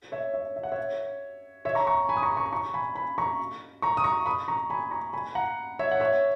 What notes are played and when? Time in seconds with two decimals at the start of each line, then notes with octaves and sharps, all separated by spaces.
0.12 C#5 E5
0.34 C#5 E5
0.56 E5
0.63 F#5
0.72 C#5 E5
1.65 C#5 E5
1.75 A#5 C#6
1.87 A#5 C#6
2.09 G#5 B5
2.17 D#6
2.23 A#5 C#6
2.37 A#5 C#6
2.52 A#5 C#6
2.74 G#5 B5
2.95 G#5 B5
3.18 A#5 C#6
3.82 A#5 C#6
3.97 D#6
4.04 A#5 C#6
4.26 B5 D#6
4.48 A#5 C#6
4.70 G#5 B5
4.91 A#5 C#6
5.13 G#5 B5
5.35 F#5 A#5
5.79 C#5 E5
5.92 F#5
6.00 C#5 E5